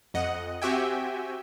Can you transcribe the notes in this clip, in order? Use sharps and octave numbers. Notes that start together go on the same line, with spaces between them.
F2 D#5 F#5
C4 F#4 G4 E5 G5 G#5